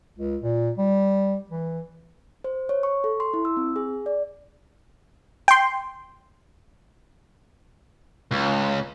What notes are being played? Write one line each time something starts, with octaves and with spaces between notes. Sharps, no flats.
C#2
A#2
G3
E3
C5
C#5
C#6
A4
C6
E4
E6
C4
G#4
D5
G5 C6
C#2